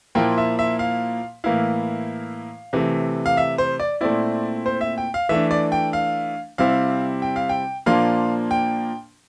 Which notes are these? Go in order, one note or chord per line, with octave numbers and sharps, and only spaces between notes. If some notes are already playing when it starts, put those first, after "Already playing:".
A#2 F3 A#3 E4 G5
E5
E5
F5
A2 E3 A#3 E4 F5
C3 E3 A3
F5
E5
C5
D5
A#2 A3 C4 E4 D5
C5
E5
G5
F5
E3 A3 D4 E5
D5
G5
F5
C3 G3 C4 E4 F5
G5
F5
G5
A#2 F3 A#3 D4 F5
G5